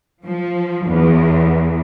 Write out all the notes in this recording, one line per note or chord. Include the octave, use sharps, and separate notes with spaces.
F3
E2